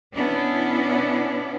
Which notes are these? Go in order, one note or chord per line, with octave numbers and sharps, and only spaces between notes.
B2 B3 C#4 D4 E4